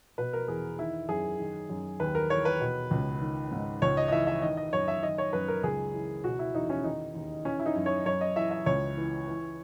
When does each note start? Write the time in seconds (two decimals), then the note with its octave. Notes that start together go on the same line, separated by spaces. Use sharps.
0.18 B2 B4
0.33 A#4
0.48 E2 G#4
0.78 D#3 E4
1.08 F#2 G#4
1.39 D#3
1.69 F#2
2.00 D#2 B4
2.15 A#4
2.30 E3 C#5
2.45 B4
2.60 B2
2.91 C#2
3.21 D#3
3.51 G#2
3.82 C#2 C#5
3.97 D#5
4.08 D#5
4.12 E3 E5
4.27 E5
4.42 D#3 D#5
4.57 D#5
4.73 F#2 C#5
4.88 E5
5.02 D#3 D#5
5.18 C#5
5.33 F#2 B4
5.48 A#4
5.63 C#2 G#4
5.94 E3
6.24 B2 F#4
6.39 E4
6.55 E2 D#4
6.70 C#4
6.84 D#3 D#4
7.15 D#2
7.45 E3 C#4
7.60 E4
7.66 D#4
7.76 F#2
7.86 C#5
8.06 F#2 C#5
8.21 D#5
8.36 E3 E5
8.51 E5
8.66 C#2 C#5
8.97 E3
9.27 E3